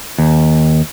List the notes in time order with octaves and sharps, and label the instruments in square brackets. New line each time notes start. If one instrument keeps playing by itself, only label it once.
[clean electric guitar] D#2